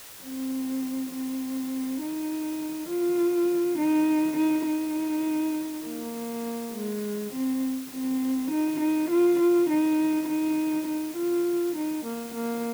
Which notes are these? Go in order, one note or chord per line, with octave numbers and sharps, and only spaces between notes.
C4
C4
D#4
F4
D#4
D#4
D#4
A#3
G#3
C4
C4
D#4
D#4
F4
F4
D#4
D#4
D#4
F4
D#4
A#3
A#3